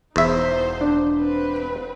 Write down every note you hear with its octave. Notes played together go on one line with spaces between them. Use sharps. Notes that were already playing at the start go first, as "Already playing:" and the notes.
E1 E2 D#4 C5 E5
D4
C4 B4